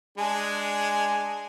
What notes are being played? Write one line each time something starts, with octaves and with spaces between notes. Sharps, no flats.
G#3 D4 G#4